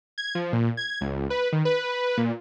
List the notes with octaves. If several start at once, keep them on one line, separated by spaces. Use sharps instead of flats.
G#6
F3
A#2
G#6
C#2
B4
D#3
B4
A#2